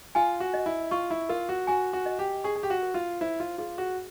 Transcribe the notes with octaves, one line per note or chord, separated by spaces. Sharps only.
F4 G#5
F#4
D#5
E4
F4 C#6
E4
F4 A#4
F#4
F#4 G#5
F#4
D#5
G4
G#4 C#6
G#4
G4
F#4
A#4
F4
E4 C5
F4
F4 G#4
F#4